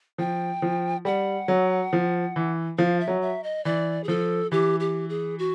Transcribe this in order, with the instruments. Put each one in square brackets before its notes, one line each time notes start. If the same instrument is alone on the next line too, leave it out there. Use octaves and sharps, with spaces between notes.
[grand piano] F3 [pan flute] G5
[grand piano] F3
[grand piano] G3 [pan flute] F#5
[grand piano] F#3
F3
E3
[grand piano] F3 [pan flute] F5
[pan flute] E5
[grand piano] F#3
[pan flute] E5
D#5
[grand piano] E3 [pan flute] D5
[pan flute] G#4
[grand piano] F3 [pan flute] A4
[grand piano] E3 [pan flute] G4
[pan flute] G4
G#4
F#4